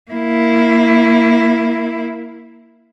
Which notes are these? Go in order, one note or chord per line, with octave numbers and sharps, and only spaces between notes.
A#3 E4